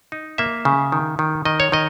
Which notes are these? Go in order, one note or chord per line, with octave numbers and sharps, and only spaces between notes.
D#4
A#3 E5
C#3
D#3
D#3
D#3 D#5
C#5
D#3 D#5